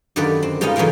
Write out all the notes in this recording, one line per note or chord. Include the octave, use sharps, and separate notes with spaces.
F#2 D3 D#3 G4 B4 D5
C4
G3 G#3 B3 D#4 F4 D#5
C#3 E3 F#3 A3 A#3 G5